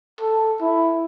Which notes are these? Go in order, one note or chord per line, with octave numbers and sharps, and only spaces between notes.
A4
E4